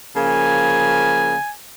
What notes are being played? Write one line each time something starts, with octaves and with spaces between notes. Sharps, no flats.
C#3 F3 A#3 G#5